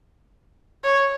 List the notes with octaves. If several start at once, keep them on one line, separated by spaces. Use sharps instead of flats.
C#5